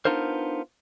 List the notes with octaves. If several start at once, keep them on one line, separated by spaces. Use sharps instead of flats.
B3 D4 D#4 F4 A#4 C5